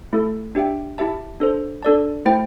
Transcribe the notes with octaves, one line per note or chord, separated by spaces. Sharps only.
A3 E4 A4
D4 G4 E5 G5
E4 G4 E5 A5
D4 A4 C5
D4 A4 D5 A5
A3 E4 C5 G5